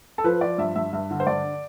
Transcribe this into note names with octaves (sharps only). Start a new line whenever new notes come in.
A4
F3 B4
F3 D5
G2 E5
G2 E5
G2 E5
D3
C5
G2 D5